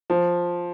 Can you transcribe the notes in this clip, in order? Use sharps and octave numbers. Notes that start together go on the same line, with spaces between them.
F3